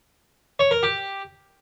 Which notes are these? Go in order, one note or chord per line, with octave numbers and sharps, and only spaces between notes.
C#5
A#4
G4